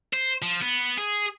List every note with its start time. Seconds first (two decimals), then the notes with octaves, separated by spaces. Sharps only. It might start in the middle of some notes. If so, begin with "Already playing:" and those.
0.13 C5
0.42 F3
0.62 B3
0.98 G#4